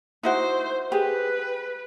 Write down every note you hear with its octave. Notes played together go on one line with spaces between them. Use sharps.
D#4 E4 F#4 C5
G4 G#4 B4